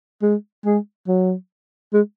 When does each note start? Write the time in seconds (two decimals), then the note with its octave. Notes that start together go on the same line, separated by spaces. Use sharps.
0.22 G#3
0.65 G#3
1.08 F#3
1.93 G#3